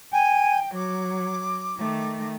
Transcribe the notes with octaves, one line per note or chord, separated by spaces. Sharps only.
G5 G#5
F#3 D6
D#3 A3